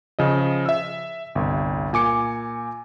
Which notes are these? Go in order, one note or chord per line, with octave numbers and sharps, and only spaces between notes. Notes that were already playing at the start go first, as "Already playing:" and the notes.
C#3 F3 D#5
E5 E6
G1 C2
A#2 G#5 D6 C#7